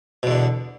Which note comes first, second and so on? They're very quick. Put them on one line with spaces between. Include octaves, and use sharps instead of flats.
B2 E2 D3